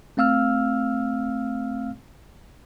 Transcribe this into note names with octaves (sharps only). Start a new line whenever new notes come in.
A3 C4 F5 E6 F6